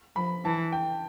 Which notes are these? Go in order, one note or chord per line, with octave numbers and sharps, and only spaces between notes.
F3 B5
E3 A5
G5